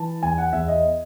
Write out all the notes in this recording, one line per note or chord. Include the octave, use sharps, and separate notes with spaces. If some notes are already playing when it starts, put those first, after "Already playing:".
Already playing: E3 A5
E2 G#5
F#5
E2 E5
D#5